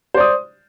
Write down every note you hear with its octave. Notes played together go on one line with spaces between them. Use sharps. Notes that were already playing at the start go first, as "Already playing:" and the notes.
C5 D5 D#6